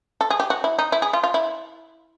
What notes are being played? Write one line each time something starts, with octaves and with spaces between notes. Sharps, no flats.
A4
G#4
G4
F#4
E4
D#4
E4
G#4
F4
F4
E4